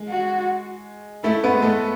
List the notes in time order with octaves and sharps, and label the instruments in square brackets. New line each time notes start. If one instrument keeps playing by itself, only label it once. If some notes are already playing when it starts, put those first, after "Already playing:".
Already playing: [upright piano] G#3
[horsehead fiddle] F#4
[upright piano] A3 A4 [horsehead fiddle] E4
[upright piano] B3 B4
[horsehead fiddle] G#3
[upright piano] A3 A4